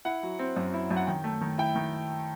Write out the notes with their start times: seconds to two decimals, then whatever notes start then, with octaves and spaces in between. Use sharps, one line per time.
0.05 E4 F#5
0.23 F#3
0.39 C4
0.56 F#2
0.74 E4
0.91 F#2
0.96 F#5
1.07 D#3 G5
1.24 A3
1.41 D#3
1.58 E4 G5
1.76 D#3